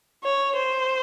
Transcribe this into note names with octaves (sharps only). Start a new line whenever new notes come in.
C#5
C5